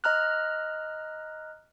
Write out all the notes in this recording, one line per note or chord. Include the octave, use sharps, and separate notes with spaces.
D#5 A#5 F6 F#6